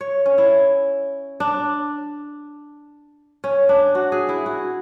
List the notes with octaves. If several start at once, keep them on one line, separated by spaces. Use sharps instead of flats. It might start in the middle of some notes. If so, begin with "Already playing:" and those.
C#5
C#4
E4
D4
C#4
D4
F#4
G#4
E4
F#4